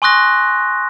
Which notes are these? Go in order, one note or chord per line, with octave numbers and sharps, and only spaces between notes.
G#5 C6 C#6 D#6 F#6 A#6